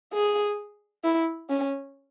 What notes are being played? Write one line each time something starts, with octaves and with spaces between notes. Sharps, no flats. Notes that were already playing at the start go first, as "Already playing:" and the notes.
G#4
E4
C#4